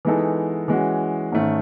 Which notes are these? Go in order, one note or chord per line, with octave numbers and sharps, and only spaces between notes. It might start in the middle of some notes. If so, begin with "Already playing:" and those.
E3 G#3 B3 D#4 A4
E3 G#3 C#4 F#4
G#2 D#3 A3 C#4